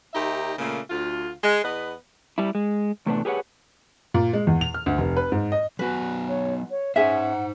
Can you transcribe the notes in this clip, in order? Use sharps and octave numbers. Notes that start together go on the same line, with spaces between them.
D#2 D#4 G4 E5
A#2 C#3 A3 A#3
D2 F4
G#3
E2 B3 B4 D#5
G3 E4
G#3
E2 A2 C3 A3 B3 D4
G4 G#4 B4 C#5 F#5
A#2
G#3
E2
F7
F6
D2
F1
B4
G#2
D#5
F#3 B3 F#4 B4 G#5
C#5
C#5
C#4 D#4 G#4 C5 E5 F#5